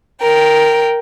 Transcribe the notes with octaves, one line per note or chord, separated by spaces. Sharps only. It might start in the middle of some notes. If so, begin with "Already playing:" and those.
A#4 G5